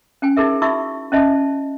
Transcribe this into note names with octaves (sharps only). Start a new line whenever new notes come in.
C#4 G5 G#5
D#4 E4 G#4 A#4 E5
D#4 E4 F#4 E5 C#6 E6
C#4 E4 D#5 E5 A5